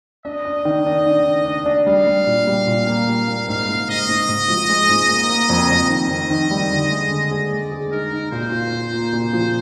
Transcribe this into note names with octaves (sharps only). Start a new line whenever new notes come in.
D4 D#5
D4
D#3
D4
D#3
D4
D4
D4
G3 F5
G3
A#2
G3
A#2
A#3
G3
A#3
G#2 F5
G#2
G#2 D#5
G#2
G#2
F3
G#3
G#2
A#3
A#3
F2
F2
D#3 D#5
F2
D#3
G3
D3
G#3
D3
G#4
G#3 D5
G#4
D#4 A#4
D#4
A#2 C5
F4
F4
A#3
A#2
F3